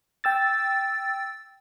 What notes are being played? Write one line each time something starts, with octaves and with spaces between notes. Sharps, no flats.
G5 E6 A6